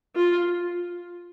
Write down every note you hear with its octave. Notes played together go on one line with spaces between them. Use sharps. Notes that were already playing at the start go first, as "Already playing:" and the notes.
F4